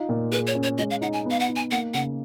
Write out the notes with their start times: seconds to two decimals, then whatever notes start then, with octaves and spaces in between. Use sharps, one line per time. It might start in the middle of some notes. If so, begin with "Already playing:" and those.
Already playing: D#4 F4
0.09 A#2
0.32 G#4 B4
0.47 C#5
0.55 C#4
0.63 C#5
0.78 G#3 D#5
0.90 F5
1.01 D#4 F#5
1.13 G#5
1.25 B3
1.31 F5
1.40 F#5
1.48 D#4
1.56 G#5
1.71 A#3 F#5
1.94 C#3 F#5